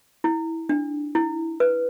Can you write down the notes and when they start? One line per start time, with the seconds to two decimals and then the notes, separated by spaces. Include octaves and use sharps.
0.24 E4
0.69 D4
1.15 E4
1.60 B4